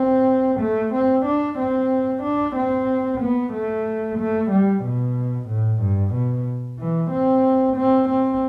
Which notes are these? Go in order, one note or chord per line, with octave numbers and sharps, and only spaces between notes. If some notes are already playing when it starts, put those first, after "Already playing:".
Already playing: C4
A3
C4
D4
C4
D4
C4
B3
A3
A3
G3
B2
A2
G2
B2
E3
C4
C4
C4